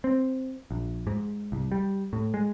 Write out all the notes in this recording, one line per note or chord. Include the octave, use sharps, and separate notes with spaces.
C4
A#1
G#2
C2
G3
A2
G#3